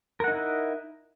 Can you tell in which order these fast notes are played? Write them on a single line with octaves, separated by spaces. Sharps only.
A#4 F#5 D#4 E4